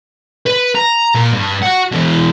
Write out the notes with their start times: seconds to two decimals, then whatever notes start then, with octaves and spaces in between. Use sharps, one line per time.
0.46 B4
0.75 A#5
1.15 A#2
1.34 G2
1.63 F#4 F#5
1.92 B2 E3